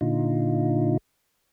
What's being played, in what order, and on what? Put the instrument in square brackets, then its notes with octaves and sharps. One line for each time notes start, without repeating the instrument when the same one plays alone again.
[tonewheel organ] A#2 D3 D#4 F4